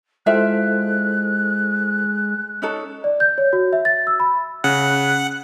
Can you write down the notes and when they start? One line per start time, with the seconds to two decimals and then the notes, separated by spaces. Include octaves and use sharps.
0.26 G#3 E4 F4 A4 C5 E5 G5 F#6
2.62 C#4 D#4 A4
3.04 D5
3.20 G6
3.38 C#5
3.53 F#4
3.73 E5
3.85 A6
4.07 E6
4.20 B5
4.64 C#3 F#5 F#6